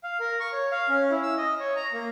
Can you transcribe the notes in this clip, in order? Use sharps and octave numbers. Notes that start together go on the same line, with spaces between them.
F5
A#4
C#6
C#5
F5
C#4
E4
E6
D#5
C#5
A#5
A#3